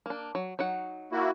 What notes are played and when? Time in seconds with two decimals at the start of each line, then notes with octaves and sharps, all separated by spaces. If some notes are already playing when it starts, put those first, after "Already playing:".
0.06 A#3 D4
0.35 F#3
0.59 F#3 D#4 F#5
1.12 A#3 E4 F#4